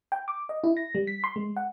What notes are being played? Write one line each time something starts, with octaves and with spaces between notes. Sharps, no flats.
G5
D6
D#5
E4
A#6
G3
B6
C6
G#3
F#5